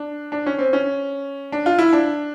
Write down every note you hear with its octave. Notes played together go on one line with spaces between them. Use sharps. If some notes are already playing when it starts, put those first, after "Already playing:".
Already playing: D4
D4
C#4
C4
C#4
D4
F4
E4
D4